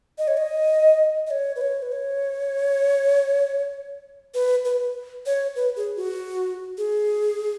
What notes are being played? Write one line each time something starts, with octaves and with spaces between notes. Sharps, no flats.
D#5
C#5
D#5
D#5
C#5
B4
C#5
B4
C#5
B4
B4
C#5
B4
G#4
F#4
G#4